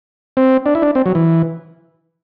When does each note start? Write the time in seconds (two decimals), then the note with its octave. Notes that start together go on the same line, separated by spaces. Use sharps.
0.37 C4
0.66 D4
0.75 E4
0.82 D4
0.95 C4
1.06 F#3
1.15 E3